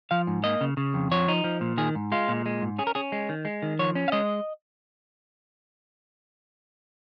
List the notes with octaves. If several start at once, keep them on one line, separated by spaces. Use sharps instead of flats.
F3 F5
G#2
A#3 D#5
C#3
C#3
F2
F3 C#5
D#4
F3
A#2
D#3 G#4
G#2
G#3 F4
A#2
G#3
G#2
C#4 G#4
A#4
C#4 G#4
G#3
D#3
G#3
D#3
F3 C#5
C#4
F5
G#3 D#5